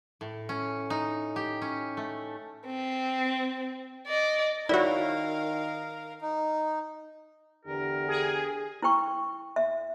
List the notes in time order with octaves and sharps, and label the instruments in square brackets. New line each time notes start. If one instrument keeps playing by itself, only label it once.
[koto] A2
C#4
D#4
G4
C#4
A3
[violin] C4
D5 D#5
[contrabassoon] D#3 [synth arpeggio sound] E4 F#4 [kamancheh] A#4 F5 [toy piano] C#5 D5
[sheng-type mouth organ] D#4
[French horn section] E2 D3 G4 [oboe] A#4
[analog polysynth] G#4
[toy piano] E4 B4 G5 C#6
E5